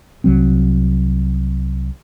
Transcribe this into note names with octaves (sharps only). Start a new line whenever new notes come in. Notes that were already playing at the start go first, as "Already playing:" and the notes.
C2 F#3 C4